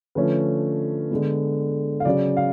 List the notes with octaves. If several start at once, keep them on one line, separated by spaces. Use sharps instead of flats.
D3 F3 A3 C#4 B4
D3 G#3 B3
F5
C#3 F#3 C#4 D5
F5